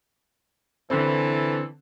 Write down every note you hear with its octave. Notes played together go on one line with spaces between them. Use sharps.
D3 E3 C4 A4